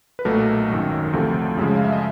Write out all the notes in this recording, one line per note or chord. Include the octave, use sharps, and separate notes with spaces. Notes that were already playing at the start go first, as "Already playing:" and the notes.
B4
B1 A#2 F#3 A3 A#4
G#1 F#2 D#3
D2 C3 F3 A3
F#2 C#3 F3 G#3
F5
E5
D#5